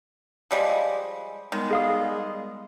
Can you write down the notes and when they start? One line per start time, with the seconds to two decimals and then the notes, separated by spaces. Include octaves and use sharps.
0.51 F3 G3 G#3
1.52 D#3 G3 G#3 B3
1.71 G#4 F5 D#6